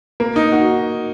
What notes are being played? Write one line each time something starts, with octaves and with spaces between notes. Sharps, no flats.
A#3
D#4
F#4